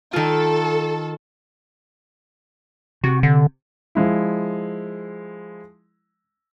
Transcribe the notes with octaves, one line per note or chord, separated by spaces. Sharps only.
D#3 F4 A4
C3 F#4
D3
F3 G#3 E4